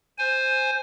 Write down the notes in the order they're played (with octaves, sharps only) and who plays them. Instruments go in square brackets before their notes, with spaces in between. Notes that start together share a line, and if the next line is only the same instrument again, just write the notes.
[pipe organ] C5 G#5